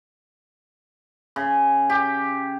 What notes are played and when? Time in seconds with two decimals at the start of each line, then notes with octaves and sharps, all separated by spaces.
1.36 C#3
1.90 G4